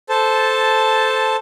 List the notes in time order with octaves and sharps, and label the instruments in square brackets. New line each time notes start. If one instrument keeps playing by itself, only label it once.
[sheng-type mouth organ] A4 C5 A5